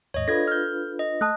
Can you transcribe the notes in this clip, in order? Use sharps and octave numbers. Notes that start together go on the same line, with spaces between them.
D#2 G#2 C#5 D#5
D4 F4 A4 B4 G#6 A#6
F6 G6
D#5
A3 A5 D#6 F#6